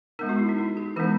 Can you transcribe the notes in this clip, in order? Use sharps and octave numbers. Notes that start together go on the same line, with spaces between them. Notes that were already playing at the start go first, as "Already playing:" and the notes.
G#3 B3 D#4 A#4
F#4
E4
D#4
E4
G#4
E3 G#3 B3 D#4 A#4